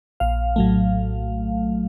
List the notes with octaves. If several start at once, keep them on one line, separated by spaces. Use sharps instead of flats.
A#1 F5
A2 F#3 A3